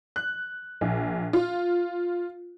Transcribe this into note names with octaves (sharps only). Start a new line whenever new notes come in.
F#6
A#1
F4